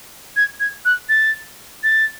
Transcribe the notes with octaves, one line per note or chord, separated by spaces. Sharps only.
G#6
G#6
F#6
A6
A6